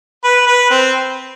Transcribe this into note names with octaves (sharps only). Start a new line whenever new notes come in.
B4
B4
C4